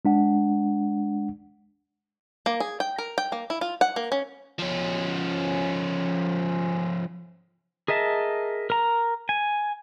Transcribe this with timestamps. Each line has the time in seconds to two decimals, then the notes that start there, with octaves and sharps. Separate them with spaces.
0.05 G#3 D4 F#5
2.46 A#3
2.60 G#4
2.80 G5
2.98 A#4
3.18 G5
3.32 A#3
3.50 E4
3.61 F4
3.81 F#5
3.96 A#3
4.12 C#4
4.59 F3 C#4
7.88 G#4 A#4 D#5 E5 A5
8.70 A#4 A#5
9.29 G#5